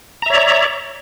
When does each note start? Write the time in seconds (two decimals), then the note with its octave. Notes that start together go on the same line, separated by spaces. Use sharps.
0.22 A#5
0.26 E5
0.30 C#5
0.34 D5